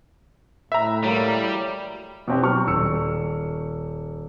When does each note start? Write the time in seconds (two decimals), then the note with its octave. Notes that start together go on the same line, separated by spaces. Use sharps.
0.72 A2 B4 E5 G5 A#5
1.04 F#3 G3 A#3
2.28 B2 C4 G4
2.43 F#3 C#6 F6
2.67 D#1 E6 C#7